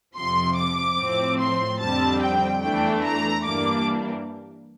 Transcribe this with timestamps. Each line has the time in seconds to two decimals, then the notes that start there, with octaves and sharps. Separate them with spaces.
0.16 F2 C3 F3 C6
0.57 D6
0.98 A2 F3 C4
1.39 C6
1.80 F2 D3 G3 C4 A5
2.22 G5
2.62 E2 E3 A3 D4 G5
3.03 A#5
3.45 G2 E3 G3 A#3 D4 D6